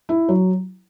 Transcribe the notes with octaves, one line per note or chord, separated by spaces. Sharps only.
E4
F#3